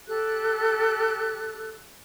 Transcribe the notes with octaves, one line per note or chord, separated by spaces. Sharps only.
G4 A4 F#6